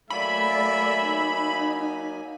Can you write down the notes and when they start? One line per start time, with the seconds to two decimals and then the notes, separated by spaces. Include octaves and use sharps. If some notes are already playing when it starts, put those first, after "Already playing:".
0.10 F#3 A3 A#3 D5 E5 G#5 B5
1.04 D#4